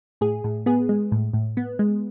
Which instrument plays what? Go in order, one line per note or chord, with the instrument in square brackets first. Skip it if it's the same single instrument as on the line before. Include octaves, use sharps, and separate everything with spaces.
[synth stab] A2 G#4
A2
B3 G#4
G#3
A2
A2
B3
G#3